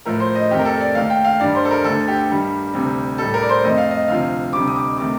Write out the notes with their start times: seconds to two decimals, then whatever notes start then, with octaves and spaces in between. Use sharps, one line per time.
0.05 A2 F3 A3 A#4
0.20 C5
0.35 D#5
0.51 F2 D#3 A3 G4
0.59 A#4
0.65 A4
0.81 D5
0.95 D#2 D#3 A3 F5
1.10 G5
1.24 F5
1.40 G2 D#3 G3 D5
1.55 C5
1.65 A4
1.70 A#4
1.84 D2 D3 A3 A4
2.08 G4
2.29 G2 D#3 G3
2.74 D2 C3 G3
3.18 A2 G3 A4
3.34 A#4
3.42 D5
3.49 C5
3.64 F2 D#3 A3 D#5
3.78 F5
3.91 D#5
4.08 D2 C3 F3 F5
4.53 D2 C3 G3 D6
4.67 D#6
4.76 D6
4.98 C3 D#3 A3 D6